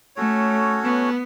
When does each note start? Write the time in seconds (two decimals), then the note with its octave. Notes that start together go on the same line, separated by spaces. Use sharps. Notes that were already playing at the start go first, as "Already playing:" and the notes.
0.16 A3 C#4 F#4 A4 C#5
0.83 B3